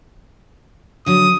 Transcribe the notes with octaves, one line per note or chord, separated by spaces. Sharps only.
D3 F#3 D#6